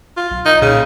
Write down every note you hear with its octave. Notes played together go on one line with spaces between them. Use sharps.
F4
B1
D#4
A#2 C#3